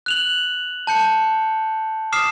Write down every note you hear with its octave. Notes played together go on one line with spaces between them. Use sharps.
F#6 F7 F#7
A5 G6 C#7
D6 D#6 F6 C7 E7